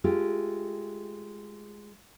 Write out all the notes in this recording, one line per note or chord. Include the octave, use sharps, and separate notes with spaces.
G#3 A3 F4 G4